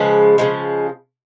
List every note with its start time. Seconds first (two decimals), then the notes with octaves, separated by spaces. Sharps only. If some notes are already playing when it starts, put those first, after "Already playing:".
Already playing: C#3 F3 G#3 B4
0.38 C#3 F3 G#3